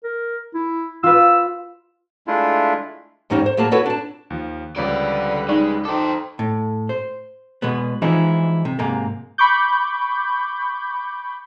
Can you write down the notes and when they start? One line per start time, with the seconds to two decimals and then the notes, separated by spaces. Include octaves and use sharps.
0.04 A#4
0.54 E4
1.03 F4 B4 E6
2.27 G#3 A3 D4 E4 F4
3.30 E2 G#2 C#4 D#4 G4 C5
3.46 C5
3.57 A2 F#3 A#3 G#4 A5
3.71 E4 F#4 A4 B4 C#5 F#5
3.86 D4 A5
4.30 D#2 F3
4.76 C#2 D3 F3 G3 B4 C#5 D5
5.49 G#3 D#4 D5
5.85 D#4 A4 C5 G5 D6
6.39 A2
6.89 C5
7.62 B2 G#3 B3
8.02 E3 F3 G#3 D#4 E4
8.65 C3
8.79 G#2 C3 A#3
9.38 B5 C#6 D6 G6